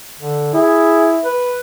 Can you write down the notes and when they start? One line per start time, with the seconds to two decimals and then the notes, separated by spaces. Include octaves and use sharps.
0.21 D3
0.54 E4 G#4
1.25 B4